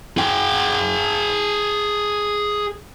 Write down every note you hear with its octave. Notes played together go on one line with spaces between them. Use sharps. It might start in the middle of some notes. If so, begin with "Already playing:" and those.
G#4 G5